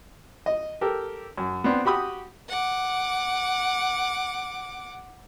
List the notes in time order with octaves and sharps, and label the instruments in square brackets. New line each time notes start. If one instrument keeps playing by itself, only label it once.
[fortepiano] D#5
G4 A4 A#4
F#2
B3 C4 D4
F#4 G4 B5 D#6
[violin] F#5 D6